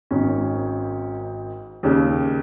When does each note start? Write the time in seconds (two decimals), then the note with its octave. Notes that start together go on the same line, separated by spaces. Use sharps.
0.11 G#1 G#2 D#3 C#4
1.83 D#2 C#3